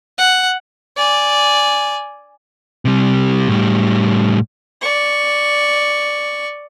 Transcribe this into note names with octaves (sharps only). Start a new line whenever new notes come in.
F#5
D5 G#5
C3 G3
A2 G3
D5 C#6